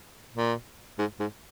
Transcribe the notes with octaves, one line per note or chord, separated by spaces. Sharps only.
A#2
G#2
G#2